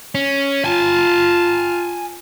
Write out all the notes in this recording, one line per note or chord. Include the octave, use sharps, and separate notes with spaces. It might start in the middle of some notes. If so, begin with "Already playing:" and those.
C#4
F4 G#5 A5